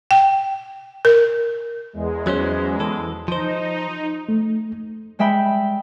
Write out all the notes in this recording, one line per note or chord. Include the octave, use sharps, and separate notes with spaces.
G5
A#4
E2 G#3
F#3 C#4 C5
E3 A4
F3 D#4 C5
A3
G3 G#3 E5 G5 B5